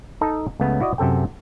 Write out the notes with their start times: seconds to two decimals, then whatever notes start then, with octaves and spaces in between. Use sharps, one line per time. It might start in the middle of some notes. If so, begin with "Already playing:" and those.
0.21 D#4 A4 D#5 A5
0.60 C#2 C#3 A3 B3
0.80 E4 F#4 D5 D#5
0.98 F#2 C3 A4 G5